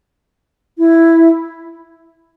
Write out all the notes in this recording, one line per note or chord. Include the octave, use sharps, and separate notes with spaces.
E4